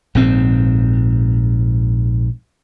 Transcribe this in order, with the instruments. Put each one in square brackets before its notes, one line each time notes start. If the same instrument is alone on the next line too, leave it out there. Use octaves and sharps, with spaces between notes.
[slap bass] A#1 G#2 C4